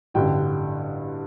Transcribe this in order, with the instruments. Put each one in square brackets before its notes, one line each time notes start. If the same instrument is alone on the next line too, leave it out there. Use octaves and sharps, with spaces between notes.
[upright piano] A1 G2 D3 G3 G5